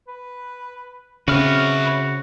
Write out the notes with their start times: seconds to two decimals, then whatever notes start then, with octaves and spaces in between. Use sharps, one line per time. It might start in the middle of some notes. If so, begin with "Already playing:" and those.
0.07 B4
1.28 C#3 C4 E4 F#4 B4 C#5 F6